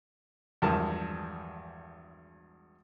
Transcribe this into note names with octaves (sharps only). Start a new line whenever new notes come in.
G#1 E2 G2 F3 A#4 A5